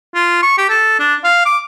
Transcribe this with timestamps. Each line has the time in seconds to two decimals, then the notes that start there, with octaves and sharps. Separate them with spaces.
0.14 F4
0.42 C#6
0.58 G4
0.69 A4
0.99 D4
1.24 F5
1.45 D6